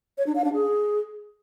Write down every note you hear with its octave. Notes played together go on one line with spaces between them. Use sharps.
C#5
D4
F5
D4
G#4